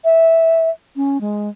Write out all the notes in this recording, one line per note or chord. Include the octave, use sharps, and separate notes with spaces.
E5
C#4
G#3